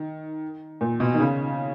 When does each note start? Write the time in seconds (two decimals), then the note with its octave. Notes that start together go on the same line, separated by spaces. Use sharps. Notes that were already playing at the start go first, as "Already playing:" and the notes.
Already playing: D#3
0.81 A#2
1.00 B2
1.14 D#3
1.20 C#3